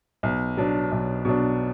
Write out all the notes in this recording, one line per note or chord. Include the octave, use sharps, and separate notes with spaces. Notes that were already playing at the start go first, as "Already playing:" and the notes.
B1
B2 F#3 D4
B1
B2 F#3 D4